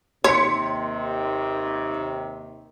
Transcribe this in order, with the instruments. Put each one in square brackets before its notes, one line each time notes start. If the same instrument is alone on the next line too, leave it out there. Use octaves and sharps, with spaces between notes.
[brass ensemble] D#2 C3 D#3 [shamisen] C#5 [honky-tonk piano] C6 B6 C#7